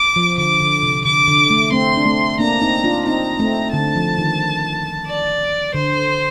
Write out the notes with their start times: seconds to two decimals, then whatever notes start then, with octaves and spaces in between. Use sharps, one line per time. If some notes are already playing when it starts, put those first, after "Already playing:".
Already playing: D6
0.16 F3
0.38 D3 D6
0.61 D3
0.83 C3
1.05 D3 D6
1.28 D3
1.50 A3
1.72 A3 C4 C6
1.97 D4
2.06 A3 C4
2.39 A#3 D4 A#5
2.61 C4 D#4
2.84 D4 F4
3.06 C4 D#4 A#5
3.40 A3 C4
3.73 D3 A5
3.96 F3
4.18 D#3
5.07 D5
5.74 D3 C5